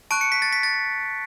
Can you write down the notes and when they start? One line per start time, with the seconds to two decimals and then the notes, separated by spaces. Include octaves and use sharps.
0.11 A5 C#6 F#6 D7
0.21 C#7
0.32 B6
0.42 A6
0.52 B6
0.63 A6